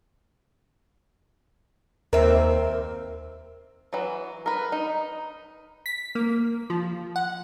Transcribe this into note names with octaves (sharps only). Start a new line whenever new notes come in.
D#2 C4 A#4 E5
E3 F#3
A#4 B4
D#4
B6
A#3
F3
F#5